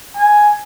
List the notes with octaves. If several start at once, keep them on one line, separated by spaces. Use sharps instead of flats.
G#5